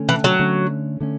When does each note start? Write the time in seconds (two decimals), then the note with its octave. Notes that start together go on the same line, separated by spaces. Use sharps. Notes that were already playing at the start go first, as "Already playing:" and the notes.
Already playing: D3 A3 C#4
0.09 E3
0.24 F#3
0.39 D3 A3 C#4
1.00 D3 A3 C#4